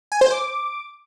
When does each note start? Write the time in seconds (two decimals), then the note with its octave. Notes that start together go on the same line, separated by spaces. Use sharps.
0.12 G#5
0.21 C5
0.31 D6